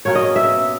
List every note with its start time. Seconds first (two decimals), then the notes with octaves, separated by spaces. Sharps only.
0.05 B2 A#3 C#4 C#5
0.15 D#5
0.36 E5